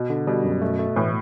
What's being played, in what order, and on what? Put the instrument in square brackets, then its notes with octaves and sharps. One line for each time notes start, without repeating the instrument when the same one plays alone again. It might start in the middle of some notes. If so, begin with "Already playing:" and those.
Already playing: [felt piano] B2
[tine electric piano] D3
[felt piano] B2 [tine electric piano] G3
[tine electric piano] F#2
[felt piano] B2 [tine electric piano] A3
[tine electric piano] A3
[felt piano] A2 [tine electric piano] E3